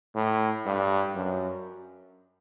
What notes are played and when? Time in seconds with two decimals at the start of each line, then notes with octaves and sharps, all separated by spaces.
0.15 A2
0.66 G2
1.15 F#2